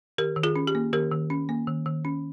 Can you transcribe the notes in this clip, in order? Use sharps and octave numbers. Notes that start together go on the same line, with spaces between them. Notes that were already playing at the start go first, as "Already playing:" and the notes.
D#3 G4 A#4
D#3
F4 G#4
C#4
G4
A#3
D#3 G4 A#4
D#3
C#4
A#3
D#3
D#3
C#4